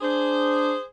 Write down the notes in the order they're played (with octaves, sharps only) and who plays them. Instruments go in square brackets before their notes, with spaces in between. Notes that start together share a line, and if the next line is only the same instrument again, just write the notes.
[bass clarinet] D4 [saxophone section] G#4 C5